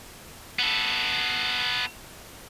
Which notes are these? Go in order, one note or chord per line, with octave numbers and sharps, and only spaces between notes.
B3 A4